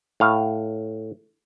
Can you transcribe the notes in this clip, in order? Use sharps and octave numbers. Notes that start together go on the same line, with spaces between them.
A2 F5